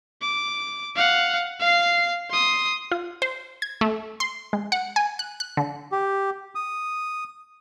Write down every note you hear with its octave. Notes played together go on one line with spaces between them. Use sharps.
D6
F5 F#5
F5 C7
C6 D#6
F4
C5
G#6
A3
C6
G#3
F#5
G#5
F#6
F#6
D3
G4
D#6